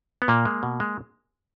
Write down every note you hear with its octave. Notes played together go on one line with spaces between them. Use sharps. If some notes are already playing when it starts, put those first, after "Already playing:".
B3
A#2 A#3
G#3
B2
G#3